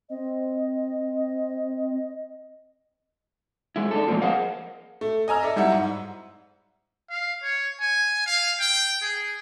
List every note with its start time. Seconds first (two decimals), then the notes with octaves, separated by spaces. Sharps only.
0.10 C4 D#5
3.76 G#3 E4
3.91 D4 D#4 A4
4.08 F3 F#3 G#3 A#3 C4 F4
4.22 G#4 A#4 C5 D#5 F5 F#5
5.01 A3
5.28 D#5 G#5 A#5 E6
5.43 A4 D5 E5
5.56 F#3 G3 E4 E5 F#5
5.72 G#2
7.10 F5
7.43 C#5
7.80 G#5
8.26 F5
8.60 G5
9.01 G#4